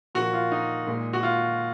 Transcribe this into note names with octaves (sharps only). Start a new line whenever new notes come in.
A#2 F3 A#3 F#4
F4
D#4
A#2 G#3
F#4
F4